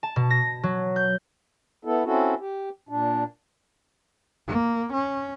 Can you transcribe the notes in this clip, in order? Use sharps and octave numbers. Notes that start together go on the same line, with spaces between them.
A5
B2
A#6
F#3
G6
B3 E4 A4
C4 C#4 E4 F#4 A4
G4
A#2 D4
A#3
C#4